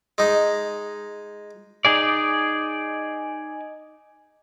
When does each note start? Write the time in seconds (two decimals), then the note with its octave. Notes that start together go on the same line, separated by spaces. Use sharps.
0.18 G#3 D#4
1.85 D#4 G#4 D5